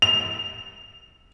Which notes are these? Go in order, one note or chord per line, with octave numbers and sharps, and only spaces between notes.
F7